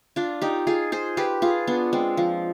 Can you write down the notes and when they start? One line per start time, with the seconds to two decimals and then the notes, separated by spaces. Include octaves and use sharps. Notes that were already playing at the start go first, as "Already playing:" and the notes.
0.16 D4 F4
0.42 D#4 G4
0.67 F4 G#4
0.92 G#4 C5
1.17 G4 B4
1.42 F4 G#4
1.67 B3 D4
1.93 G#3 C4
2.17 F3